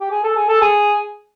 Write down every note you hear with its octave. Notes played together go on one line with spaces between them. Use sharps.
G4
G#4
A4
G#4
A4
G#4